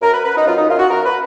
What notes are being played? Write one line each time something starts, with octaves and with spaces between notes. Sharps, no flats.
F#2 A#4
B4
F#2 B4
D#4
F#2 F4
D#4
F#2 F4
F#4
F#2 A#4
B4